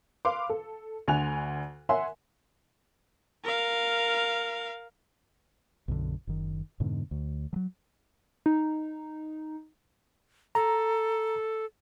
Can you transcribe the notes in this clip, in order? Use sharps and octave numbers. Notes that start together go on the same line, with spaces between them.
B4 F5 C6 D6
A4
D2 D3 G#5 F#6 F7
A#4 C#5 E5 F#5 G#5 C6
A#4 F5
B1 F#2 D3
F#1 D#3
F2 G#2 B2 D3
D2
F3 F#3
D#4
A4 A#5